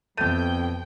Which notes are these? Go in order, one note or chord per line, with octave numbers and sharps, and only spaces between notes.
F2 B2 A3 G4 G5 D#7